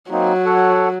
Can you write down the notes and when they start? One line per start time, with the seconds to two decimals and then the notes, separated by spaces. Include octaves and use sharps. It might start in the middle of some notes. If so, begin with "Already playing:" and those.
0.11 F#3 A#3 C4 D#4
0.46 A4 C#5 F#5